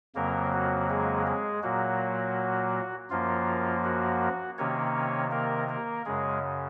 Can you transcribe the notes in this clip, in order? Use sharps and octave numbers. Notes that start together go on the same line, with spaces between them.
F2 C#3 F#3 A#3 A#4
F#4
G#3 G#4
G#3 G#4
A#2 F#3 A#3 F#4
F#2 F3 A#3 F4
F#4
C3 D#3 A#3 C#4 C#5
A#3 A#4
A#3 A#4
F#2 C#3 G#3 G#4